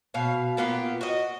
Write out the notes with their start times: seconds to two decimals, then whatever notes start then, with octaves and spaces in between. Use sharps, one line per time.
0.14 B2 F5
0.57 A#3 B3 F4 G4
1.01 F#4 D#5